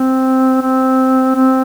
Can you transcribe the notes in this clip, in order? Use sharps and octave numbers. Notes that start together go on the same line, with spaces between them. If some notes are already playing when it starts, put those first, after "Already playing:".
Already playing: C4
C4
C4